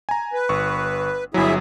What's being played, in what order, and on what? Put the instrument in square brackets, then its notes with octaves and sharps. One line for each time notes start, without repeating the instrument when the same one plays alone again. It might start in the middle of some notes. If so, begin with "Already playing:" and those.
[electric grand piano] G#5 A#5
[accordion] B4
[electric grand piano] G1 C#6
[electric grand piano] G1 F#3 [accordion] E4 G#4 E5